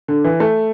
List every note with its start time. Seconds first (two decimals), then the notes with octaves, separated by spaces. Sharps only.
0.08 D3
0.24 E3
0.40 A3